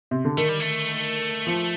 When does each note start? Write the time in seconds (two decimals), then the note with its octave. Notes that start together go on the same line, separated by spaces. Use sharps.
0.11 C3
0.25 D3
0.37 D#3 A3
0.49 G3
0.60 A3
1.47 F3